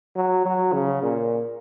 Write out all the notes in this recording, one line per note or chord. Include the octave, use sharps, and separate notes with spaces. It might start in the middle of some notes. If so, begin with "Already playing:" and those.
F#3
F#3
C#3
A#2